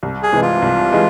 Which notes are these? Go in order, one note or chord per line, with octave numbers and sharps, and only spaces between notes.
C2
G#4
C3 E3 G#3
F4
C2
E3 G#3